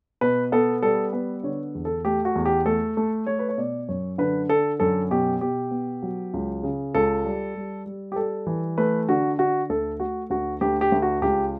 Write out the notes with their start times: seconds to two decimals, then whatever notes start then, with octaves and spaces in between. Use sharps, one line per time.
0.21 B2 B4
0.52 B3 A4
0.82 G3 A4
1.13 B3 B4
1.43 D3 C#5
1.75 E2
1.85 A4
2.05 A3 G4
2.25 F#4
2.36 E2
2.46 G4
2.66 A3 A4
2.97 A3
3.27 A3 C#5
3.39 B4
3.49 C#5
3.58 B2 D5
3.89 F#2 C#5
4.18 D3 B4
4.49 D3 A4
4.80 F#2 A4
5.11 B2 G4
5.41 B2 G4
5.71 B3
6.02 F#3
6.34 C#2
6.63 C#3
6.94 C#2 A4
7.25 G3
7.55 G3
7.86 G3
8.12 G4
8.16 G3 A4
8.46 E3
8.78 A3 B4
9.09 D3 F#4
9.39 D3 F#4
9.69 D2 A4
10.00 A3 F#4
10.30 D2 F#4
10.61 D2 G4
10.81 G4
10.92 D2
11.02 F#4
11.22 C#2 G4